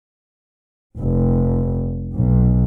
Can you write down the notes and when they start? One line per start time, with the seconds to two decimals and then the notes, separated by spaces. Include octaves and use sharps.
0.99 F1
2.16 B1